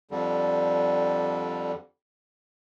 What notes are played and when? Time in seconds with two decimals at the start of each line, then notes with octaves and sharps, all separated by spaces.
0.11 F2 D3 G3